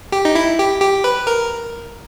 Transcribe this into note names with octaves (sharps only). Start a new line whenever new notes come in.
G4
D#4
E4
G4
G4
B4
A#4